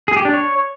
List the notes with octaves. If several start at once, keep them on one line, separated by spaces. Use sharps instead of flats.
G#4
G4
D4
C#5